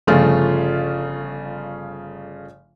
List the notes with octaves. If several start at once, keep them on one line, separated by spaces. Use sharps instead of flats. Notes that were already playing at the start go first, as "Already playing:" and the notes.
G1 C#3 F3 A3 F4 F5